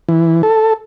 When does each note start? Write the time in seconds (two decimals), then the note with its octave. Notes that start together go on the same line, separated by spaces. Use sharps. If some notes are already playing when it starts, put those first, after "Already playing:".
0.09 E3
0.43 A4